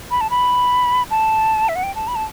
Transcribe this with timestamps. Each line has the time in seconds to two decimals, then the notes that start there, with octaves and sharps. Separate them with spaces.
0.11 B5
0.21 A5
0.30 B5
1.11 A5
1.69 E5
1.75 F#5
1.83 G5
1.95 A5
2.08 B5
2.15 A5